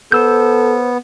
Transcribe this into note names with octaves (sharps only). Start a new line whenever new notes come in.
B3 A4 C5 E6 G6